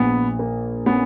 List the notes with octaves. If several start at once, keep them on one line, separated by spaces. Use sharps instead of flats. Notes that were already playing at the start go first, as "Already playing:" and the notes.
Already playing: A#1 A#2 B3
A#3
B3 C#4